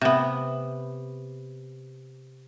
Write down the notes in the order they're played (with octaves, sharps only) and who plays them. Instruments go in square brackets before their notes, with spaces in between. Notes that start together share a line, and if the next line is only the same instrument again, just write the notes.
[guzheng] C3 B3